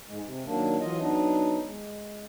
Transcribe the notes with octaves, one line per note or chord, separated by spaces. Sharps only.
G#2 G#3
C3
D#3 F#3 A#3 D4
E3 F#3 F4 D#5
F#3 B3 D4 D#4
G#3